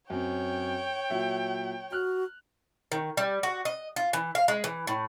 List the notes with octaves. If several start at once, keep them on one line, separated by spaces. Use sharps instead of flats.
F#2 C4 C#5 G5
A#2 F#3 E5
F#4 F6 F#6
D#3
G3
F#4
D#5
F4
E3
F5
G#3
E3
A2